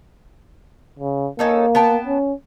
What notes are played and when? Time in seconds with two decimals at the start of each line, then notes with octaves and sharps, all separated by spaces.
0.99 C#3
1.39 A#3 C#4 D#4 A4
1.75 B3 G5 A5
2.07 C#4